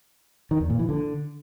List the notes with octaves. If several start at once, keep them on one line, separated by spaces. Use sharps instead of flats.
D#3
E2
A#2
E3
D3